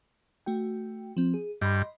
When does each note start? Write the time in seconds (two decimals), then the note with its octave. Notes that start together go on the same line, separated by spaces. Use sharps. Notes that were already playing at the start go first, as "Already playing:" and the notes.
0.46 A3 F#4 G5
1.17 F3 C4
1.34 G#4
1.61 G2 D#5 B5 C6